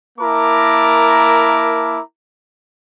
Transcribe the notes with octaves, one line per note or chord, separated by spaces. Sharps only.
A#3 E4 A#4 A5 A#5 D6